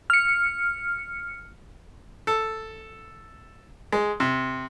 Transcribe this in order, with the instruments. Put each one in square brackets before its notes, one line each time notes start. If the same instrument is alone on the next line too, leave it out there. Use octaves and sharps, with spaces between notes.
[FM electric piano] F6 C#7
[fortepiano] A4
G#3
C3